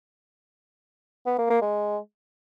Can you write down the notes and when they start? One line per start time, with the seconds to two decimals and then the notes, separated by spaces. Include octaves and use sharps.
1.26 B3
1.38 A#3
1.50 A#3
1.62 G#3